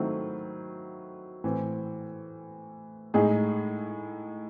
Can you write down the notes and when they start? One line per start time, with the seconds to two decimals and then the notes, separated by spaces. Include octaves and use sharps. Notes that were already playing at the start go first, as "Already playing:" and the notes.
Already playing: D#3 F#3 A3 C4 E4
1.44 A2 E3 C4
3.14 A2 G#3 D#4 G#4